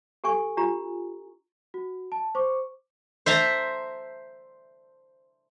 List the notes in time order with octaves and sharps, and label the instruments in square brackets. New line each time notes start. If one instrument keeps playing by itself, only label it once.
[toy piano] G4 A4 G#5 C#6
D4 F4 G4 A#5
[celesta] F#4
A5
C5 C#6 D6
[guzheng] C5 E5 A5 A#5